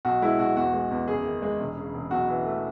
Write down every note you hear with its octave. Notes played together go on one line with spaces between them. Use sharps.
B1 F#4
G#3 E4
B1 F#4
E2 F#4
G#3
E2
F#1 G#4
D#3
G#3
E1
C#3
E1
B1 F#4
E3
A3